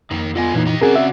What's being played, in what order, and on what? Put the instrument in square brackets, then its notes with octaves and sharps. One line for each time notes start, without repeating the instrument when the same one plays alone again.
[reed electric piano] F2 [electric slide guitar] D#3 A#3 D#4
[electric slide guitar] D3 D#5 G#5 [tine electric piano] B3 F4
[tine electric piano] A#2 E3 D#4 [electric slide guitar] A#3 B4 C#5
[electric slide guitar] G4 D#5 A#5
[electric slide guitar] C#3 F#4 D5 [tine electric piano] C4 C#4 [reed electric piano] G#4 A#4
[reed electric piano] E5